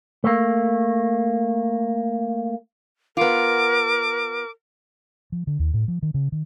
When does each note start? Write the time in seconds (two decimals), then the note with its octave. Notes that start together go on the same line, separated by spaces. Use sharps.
0.24 A3 A#3
3.17 B3 F4 A#4 D6
5.32 F3
5.47 D3
5.59 D#2
5.74 A2
5.88 F3
6.02 D#3
6.14 C#3
6.32 D#3